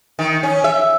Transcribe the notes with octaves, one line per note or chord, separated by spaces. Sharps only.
D#3
C#4
E5